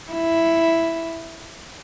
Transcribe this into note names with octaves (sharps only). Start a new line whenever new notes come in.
E4